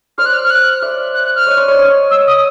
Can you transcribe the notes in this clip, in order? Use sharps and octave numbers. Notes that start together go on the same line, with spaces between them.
C5 D5 F6
F#6
F6
F6
F#6
D5 E5
F#6
F#6
F6
C#5 D#5
C5 D5
C#5 D#5
C#5 D#5
E6
D#6